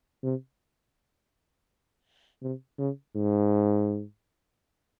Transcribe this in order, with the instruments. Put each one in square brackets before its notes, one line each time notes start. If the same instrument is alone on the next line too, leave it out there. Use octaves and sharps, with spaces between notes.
[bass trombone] C3
C3
C#3
G#2